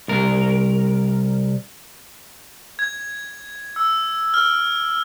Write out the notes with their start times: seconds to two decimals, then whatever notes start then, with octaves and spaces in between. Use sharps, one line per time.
0.08 C2 A#4
2.79 G#6
3.76 E6
4.34 F6